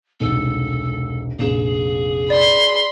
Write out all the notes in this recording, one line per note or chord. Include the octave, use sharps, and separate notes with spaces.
E1 C2 G#2 A4
F1 A#1 G#4 E7
D5 B5 C6